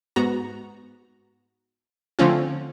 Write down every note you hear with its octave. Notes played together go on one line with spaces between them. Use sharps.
G#2 B3 F#4 A#5
D3 F3 A3 C4 C#4 F4